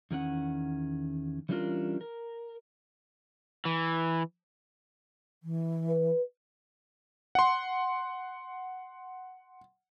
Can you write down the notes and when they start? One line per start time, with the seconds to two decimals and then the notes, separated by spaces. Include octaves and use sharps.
0.11 E2 D#3 C#4 F#5
1.49 E3 G3 C#4 D4 F4 A#4
2.01 A#4
3.65 E3
5.43 E3
5.89 B4
7.35 F#5 C6